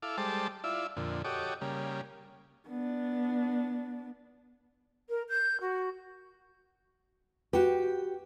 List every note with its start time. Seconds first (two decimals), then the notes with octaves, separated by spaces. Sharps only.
0.02 E4 A4 F5 D6
0.17 G3 G#3 A4 C5 A5 D6
0.64 E4 F4 D5 E5
0.97 F2 A#2 D3
1.25 F#4 G4 A4 C#5 D#5 D6
1.61 C#3 G3 A#3
2.67 B3 D4
5.09 A#4
5.29 G6
5.61 F#4
7.53 F#4 G4 B4 G5